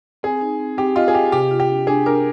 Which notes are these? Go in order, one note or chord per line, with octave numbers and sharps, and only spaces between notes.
C4 G#4
D#4
C4
C4 G4
F4 D#5
G#4
G4 D#5
C3 G4
F4
G4
D4
D4 G#4
D4 A#4